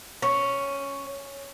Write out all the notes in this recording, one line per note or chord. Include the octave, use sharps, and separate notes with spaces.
C#4